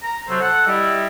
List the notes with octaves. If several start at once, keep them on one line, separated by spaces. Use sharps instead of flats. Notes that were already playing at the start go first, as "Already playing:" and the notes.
A#5
C3 F#3 A4 C5
A4 F#5
G3 E4 D#5